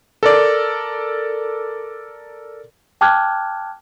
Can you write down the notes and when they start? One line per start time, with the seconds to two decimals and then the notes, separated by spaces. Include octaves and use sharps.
0.23 A4 A#4 D5
3.01 G5 A5 D6 F6 F#6 G#6